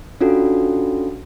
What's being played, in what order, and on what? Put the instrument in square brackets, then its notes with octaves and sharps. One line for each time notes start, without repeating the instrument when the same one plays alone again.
[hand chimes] C#4 D4 F4 F#4 A4